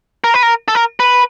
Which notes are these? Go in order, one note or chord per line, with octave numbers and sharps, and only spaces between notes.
A#4
B4
A#4
A4
A#4
B4